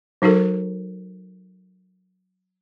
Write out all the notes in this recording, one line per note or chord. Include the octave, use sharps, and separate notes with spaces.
F#3 D#4 F#4 A4 A#4